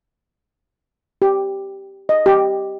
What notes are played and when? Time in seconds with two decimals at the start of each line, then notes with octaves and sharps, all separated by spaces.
1.22 G4
2.09 D#5
2.26 G4